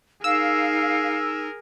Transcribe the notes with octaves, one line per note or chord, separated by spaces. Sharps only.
D#4 G#4 A#4 F5 E6